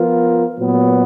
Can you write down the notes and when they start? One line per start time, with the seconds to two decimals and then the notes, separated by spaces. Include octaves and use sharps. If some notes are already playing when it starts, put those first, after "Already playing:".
Already playing: F3 B3 F4 A#4
0.59 A#2 F#3 B3